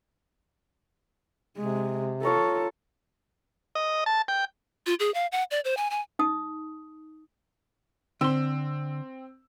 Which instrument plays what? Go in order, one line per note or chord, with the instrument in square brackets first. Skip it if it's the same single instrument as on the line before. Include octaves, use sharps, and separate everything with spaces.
[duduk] C3 [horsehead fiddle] G#3
[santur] F4 C#5 A#5 [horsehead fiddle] A4
[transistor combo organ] D#5
A5
G5
[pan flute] F4
G#4
F5
F#5
D5
C5
G#5
G#5
[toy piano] D#4 D#6
[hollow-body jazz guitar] D3 C6 [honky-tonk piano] C4 E6